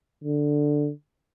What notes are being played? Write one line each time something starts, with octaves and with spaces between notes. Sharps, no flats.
D3